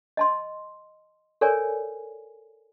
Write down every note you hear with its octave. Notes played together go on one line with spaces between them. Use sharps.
D#5 A5 C6
A4 A#4 C#5 D5 G#5